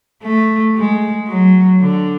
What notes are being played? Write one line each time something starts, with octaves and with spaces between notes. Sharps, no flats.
A3
G#3
F#3
D3